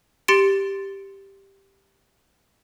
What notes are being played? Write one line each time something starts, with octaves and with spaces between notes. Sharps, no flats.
G4 C6 A6 C#7 D7